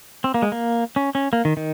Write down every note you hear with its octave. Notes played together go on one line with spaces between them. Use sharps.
C4
A#3
G#3
A#3
C#4
C#4
A#3
D#3
D#3